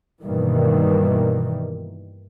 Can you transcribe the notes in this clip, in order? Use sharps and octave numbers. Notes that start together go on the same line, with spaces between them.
G2 B2 D#3 E3 G3 A#3